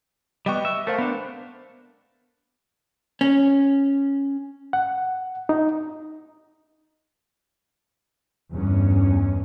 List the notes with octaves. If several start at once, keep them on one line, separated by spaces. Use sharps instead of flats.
G3 B3 D#5 G5 C#6
E5
A3 A#4 C5 F5
B3 D4
C#4
F#5
D#4
G1 E2 G2 C#4